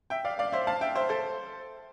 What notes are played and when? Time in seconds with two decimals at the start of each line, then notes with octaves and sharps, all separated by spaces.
0.10 E5 G5
0.25 D5 F5
0.39 D5 F5
0.53 C5 E5
0.67 F5 A5
0.81 E5 G5
0.95 C5 E5
1.09 A4 C5